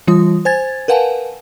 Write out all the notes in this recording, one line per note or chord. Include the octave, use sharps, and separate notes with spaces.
E3 G3 F4 D#6
C5 G#5 G#6 A6
A#4 B4 F5 F#5 G#5 A5